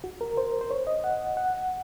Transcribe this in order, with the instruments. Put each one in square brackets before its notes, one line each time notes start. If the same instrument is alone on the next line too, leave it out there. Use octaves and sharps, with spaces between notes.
[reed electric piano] F#4
A#4
C5
C5
C#5
D#5
F#5
F#5